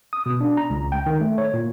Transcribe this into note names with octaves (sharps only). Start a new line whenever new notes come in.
D#6
B2
D4
A#5
C#2
G5
D#3
A3
C#5
A#2